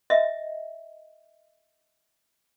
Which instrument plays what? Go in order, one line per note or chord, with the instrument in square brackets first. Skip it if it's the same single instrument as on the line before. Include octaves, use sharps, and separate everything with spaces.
[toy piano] D#5 E5